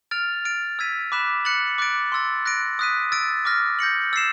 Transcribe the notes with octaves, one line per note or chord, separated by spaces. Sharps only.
F6 A6 D7 F7
F6 A6 D7
E6 G#6 B6 D#7
B5 D6 F#6 B6 E7
F#6 A6 C#7 F#7
D6 F#6 A6 D7
C6 E6 A6
F#6 A#6 D7
D#6 F#6 B6 D#7
E6 A6 D7
D6 F6 A#6
G6 A#6 C#7 F#7
E6 A6 C7 E7